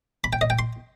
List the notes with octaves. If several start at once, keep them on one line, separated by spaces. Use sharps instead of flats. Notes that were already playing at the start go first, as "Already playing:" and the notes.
B5
G5
D#5
G5
C6